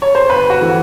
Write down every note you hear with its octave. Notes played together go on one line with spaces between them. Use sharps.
C#5
C5
G1 B4
F#4
E3 A3 C4